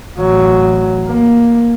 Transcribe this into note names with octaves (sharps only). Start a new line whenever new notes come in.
A1 F#3
A#3